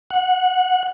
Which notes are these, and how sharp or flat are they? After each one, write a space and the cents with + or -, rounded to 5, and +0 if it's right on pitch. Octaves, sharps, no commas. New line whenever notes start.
F#5 -20